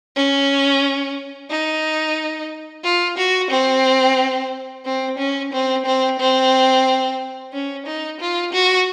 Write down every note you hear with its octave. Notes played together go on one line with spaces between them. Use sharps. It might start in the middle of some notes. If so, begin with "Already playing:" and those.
C#4
D#4
F4
F#4
C4
C4
C#4
C4
C4
C4
C#4
D#4
F4
F#4